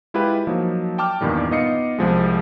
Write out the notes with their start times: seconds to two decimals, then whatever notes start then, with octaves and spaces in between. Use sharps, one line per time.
0.14 G#3 E4 F4 G4 B4
0.47 F3 F#3 A#3 D#4
0.98 G5 A5 D6 F6
1.21 E2 G2 A#2 D#3 G3
1.51 B3 D#4 F4 D#5 C7 C#7
1.98 C2 F3 G#3